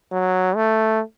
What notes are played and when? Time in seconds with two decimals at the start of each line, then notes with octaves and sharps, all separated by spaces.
0.12 F#3
0.56 A3